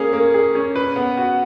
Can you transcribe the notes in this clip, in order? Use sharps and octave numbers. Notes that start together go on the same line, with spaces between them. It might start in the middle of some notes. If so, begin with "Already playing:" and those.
Already playing: A#3 C#4 G#4
A#3
G#4
C#4
B4
B3
F#4